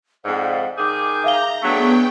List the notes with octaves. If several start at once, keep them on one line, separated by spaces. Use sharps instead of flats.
F2 G#2 D5 F5 F#5
D#3 G#4 D6 G6
E5 F5 A#5 G7
F#3 A3 B3 D4 G#4 G5 C#6